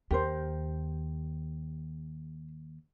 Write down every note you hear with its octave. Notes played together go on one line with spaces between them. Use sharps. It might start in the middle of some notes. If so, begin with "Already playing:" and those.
D#2 G4 A#4 C5